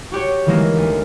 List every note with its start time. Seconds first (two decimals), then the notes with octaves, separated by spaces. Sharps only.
0.12 F#4 G4 C#5
0.46 D#3 E3 G#3 A#3
0.77 D2